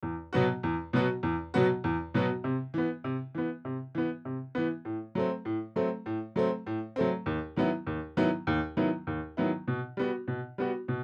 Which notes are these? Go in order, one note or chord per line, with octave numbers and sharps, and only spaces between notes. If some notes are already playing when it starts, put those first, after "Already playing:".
E2
B2 F#3 B3 F#4
E2
B2 F#3 B3 F#4
E2
B2 F#3 B3 F#4
E2
B2 F#3 B3 F#4
C3
E3 B3
C3
E3 B3
C3
E3 B3
C3
E3 B3
A2
F#3 A3 C4
A2
F#3 A3 C4
A2
F#3 A3 C4
A2
F#3 A3 C4
D#2
D#3 F#3 B3 E4
D#2
D#3 F#3 B3 E4
D#2
D#3 F#3 B3 E4
D#2
D#3 F#3 B3 E4
B2
G3 B3 F#4
B2
G3 B3 F#4
B2